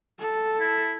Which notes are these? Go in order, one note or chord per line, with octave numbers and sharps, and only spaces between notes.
A4
E4